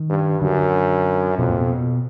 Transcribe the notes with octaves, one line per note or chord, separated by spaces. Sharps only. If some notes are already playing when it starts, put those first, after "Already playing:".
Already playing: D#3
G2
F#2 D3
F2 B2
A#2
B2